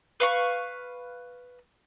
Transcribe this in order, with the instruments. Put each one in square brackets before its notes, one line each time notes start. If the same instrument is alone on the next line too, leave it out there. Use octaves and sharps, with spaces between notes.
[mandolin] B4 F5 C#6